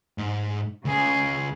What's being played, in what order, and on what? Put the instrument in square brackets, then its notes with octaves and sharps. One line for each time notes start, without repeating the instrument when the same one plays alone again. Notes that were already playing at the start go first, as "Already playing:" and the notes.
[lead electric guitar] G#2
[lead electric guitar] C#2 [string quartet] C#3 G#4